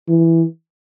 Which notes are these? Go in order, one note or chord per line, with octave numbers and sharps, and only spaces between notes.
E3